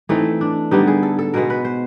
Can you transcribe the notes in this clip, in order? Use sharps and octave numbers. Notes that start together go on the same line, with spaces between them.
E3 A3 C4 D#4
D4
D3 G3 B3 D#4
G#4
A4
A4
B2 G#3 B3 A#4
B4
C5